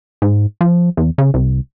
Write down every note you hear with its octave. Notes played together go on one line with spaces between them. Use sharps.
G#2
F3
E2
C#3
C2